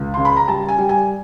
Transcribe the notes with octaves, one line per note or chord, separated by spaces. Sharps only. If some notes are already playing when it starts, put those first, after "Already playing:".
Already playing: C#2
C#3 C6
B5
A#5
G3 A5
G#5
G3
G#5